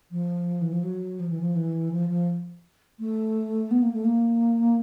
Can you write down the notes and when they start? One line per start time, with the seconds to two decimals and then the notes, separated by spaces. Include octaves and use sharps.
0.11 F3
0.61 E3
0.73 F3
0.83 F#3
1.19 F3
1.29 E3
1.41 F3
1.55 E3
1.92 F3
2.09 F3
2.99 A3
3.71 B3
3.82 A#3
3.93 A3
4.04 A#3